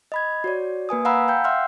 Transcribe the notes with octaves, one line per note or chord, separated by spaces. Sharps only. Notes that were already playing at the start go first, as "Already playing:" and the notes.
D#5 B5 G#6
F#4 C#5 D5
A#3 B4 G#5 D#6
F5 F#5 G#5 A#5 B5 E6
F5 G5 G6
E5 F#5 C6 E6 F6